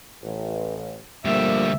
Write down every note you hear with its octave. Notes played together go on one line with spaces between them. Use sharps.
A1
D2 D3 F3 G3 A#3 E5